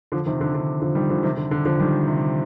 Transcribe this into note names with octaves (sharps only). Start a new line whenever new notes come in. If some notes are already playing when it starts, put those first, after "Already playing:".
D3 F3
C3 D#3
D3
D3
D3 F3
D#3 G3
D3 F3
C3 D#3
D3
D3
D3 F3
D#3 G3
C3